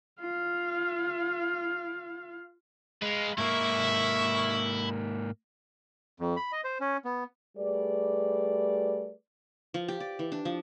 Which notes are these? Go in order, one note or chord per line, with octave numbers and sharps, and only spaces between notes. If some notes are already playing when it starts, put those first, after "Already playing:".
F4 F5
G#3 B4 F5
G#2 A#3 E4 E5 C#6
F2
B5
D#5
C5
C#4
B3
G3 A3 G#4 B4 D5
F3
G4
D5
E3
D4
F3